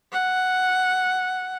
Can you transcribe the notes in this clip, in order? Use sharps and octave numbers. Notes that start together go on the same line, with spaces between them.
F#5